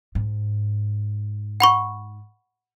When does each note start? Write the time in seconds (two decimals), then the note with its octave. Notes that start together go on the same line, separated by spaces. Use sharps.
0.15 G#2
1.60 F#5 B5 C#6